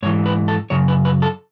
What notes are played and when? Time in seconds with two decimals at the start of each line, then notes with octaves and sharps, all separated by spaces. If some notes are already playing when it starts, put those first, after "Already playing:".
0.03 G#2 C#5
0.06 E3
0.26 B4
0.48 A4
0.70 F#2 C#3 C#5
0.88 B4
1.05 B4
1.22 A4